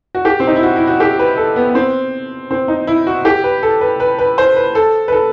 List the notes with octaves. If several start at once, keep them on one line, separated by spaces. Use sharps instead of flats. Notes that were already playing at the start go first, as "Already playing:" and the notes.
F#4
G4
C4
D#4
E4
F#4
E4
F#4
G4
B4
A4
B3
B3
C4
C4
D#4
E4
F#4
G4
B4
A4
B4
B4
B4
C5
B4
A4
B4
A4